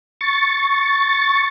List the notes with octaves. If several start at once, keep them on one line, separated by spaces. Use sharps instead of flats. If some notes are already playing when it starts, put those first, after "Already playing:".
C#6 A6